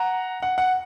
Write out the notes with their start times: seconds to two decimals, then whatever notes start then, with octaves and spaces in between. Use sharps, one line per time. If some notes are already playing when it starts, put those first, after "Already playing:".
Already playing: F#5 A#5
0.42 F#5
0.58 F#5